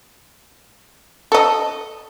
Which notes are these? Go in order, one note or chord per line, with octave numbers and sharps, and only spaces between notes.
A4 D#5